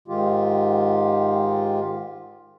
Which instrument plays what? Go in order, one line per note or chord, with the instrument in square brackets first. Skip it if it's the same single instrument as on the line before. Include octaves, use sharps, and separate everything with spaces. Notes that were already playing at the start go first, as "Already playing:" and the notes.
[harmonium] G#2 D#3 G#3 F4 G4